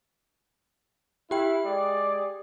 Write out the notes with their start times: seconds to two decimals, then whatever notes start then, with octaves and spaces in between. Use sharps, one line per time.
1.31 E4 G4 G5
1.65 G#3 G#4 D5